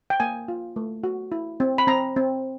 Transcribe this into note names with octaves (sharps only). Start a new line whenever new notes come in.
G5
A#3 G#5
F4
A3
F#4
E4
C4
B5
C4 A#5
C4